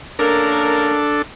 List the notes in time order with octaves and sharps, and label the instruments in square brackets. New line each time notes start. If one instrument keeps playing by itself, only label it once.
[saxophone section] A#3 C#4 A#4 [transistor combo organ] D4 A4